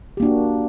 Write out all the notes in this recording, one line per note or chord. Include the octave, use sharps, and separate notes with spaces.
A#3 D4 F#4 G4